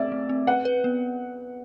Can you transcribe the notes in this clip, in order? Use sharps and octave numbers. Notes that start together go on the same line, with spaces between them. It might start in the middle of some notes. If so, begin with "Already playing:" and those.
Already playing: A3 C4 D5 E5
A3
C4
B4 F#5
B4
B3